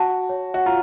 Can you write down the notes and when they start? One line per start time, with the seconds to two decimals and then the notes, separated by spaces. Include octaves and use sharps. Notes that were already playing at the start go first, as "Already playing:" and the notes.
Already playing: F#4 A5
0.29 C#5
0.54 F#4
0.66 F4 A#5